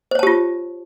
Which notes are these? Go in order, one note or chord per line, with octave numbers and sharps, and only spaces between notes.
F4 G4 C5 C#5 A5